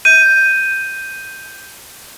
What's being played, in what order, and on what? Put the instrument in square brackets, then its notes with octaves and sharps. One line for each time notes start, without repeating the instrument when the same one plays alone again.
[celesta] G6 D#7